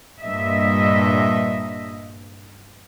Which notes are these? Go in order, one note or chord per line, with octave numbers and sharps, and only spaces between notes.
G2 A#2 D#5 E5